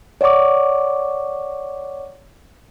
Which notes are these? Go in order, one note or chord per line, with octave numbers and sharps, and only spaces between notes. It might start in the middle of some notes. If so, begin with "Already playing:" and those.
C#5 D5 F#5 C#6 D6